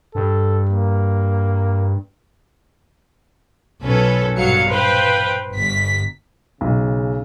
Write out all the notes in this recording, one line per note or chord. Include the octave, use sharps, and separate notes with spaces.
G2 A4
A#3
B1 C#4 A4 B4
A#1 G2 B2 F#3 F5 C#7
B4 C5 F5 G5
G1 B6
B1 C#3